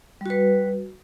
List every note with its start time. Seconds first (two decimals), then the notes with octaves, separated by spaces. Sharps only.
0.21 G3
0.26 F#4
0.30 B4